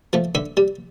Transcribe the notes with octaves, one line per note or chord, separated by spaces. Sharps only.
F3 A3
D3 E5
G3